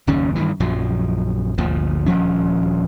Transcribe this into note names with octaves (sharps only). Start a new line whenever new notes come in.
F#1 D#2 G#2 C#4
G2 D#3 E3
A#1 F#2 F3 F#3
G1 D2 A#2 F3
D#1 D2 F3 C#4